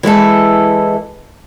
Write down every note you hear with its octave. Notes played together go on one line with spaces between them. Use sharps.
E3 G#3 E4 A4